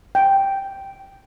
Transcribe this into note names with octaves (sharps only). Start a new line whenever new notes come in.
G5